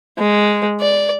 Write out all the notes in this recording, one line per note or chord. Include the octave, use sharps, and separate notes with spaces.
G#3
D5